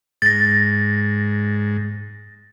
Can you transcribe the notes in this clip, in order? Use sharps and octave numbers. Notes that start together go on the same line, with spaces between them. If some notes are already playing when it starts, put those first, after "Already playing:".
G#2 A6 A#6